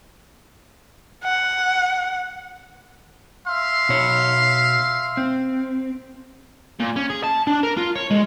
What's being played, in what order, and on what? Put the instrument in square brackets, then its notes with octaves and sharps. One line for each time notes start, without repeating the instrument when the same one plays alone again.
[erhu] F#5
[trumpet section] E5 F5 C6
[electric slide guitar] B2 C#5
C4
[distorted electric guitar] A#2
C#4
G#4
A5
D4
A#4
F4
C#5
G#3